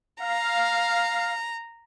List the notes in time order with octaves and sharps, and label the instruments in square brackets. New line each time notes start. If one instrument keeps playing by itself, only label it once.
[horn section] F5 [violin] A#5